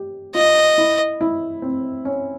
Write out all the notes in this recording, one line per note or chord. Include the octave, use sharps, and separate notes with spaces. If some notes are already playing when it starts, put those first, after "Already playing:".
Already playing: G4
F4 D#5
E4
E4
C4
C#4